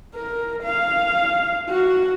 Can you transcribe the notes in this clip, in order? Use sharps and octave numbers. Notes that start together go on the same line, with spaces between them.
A#4
F5
F#4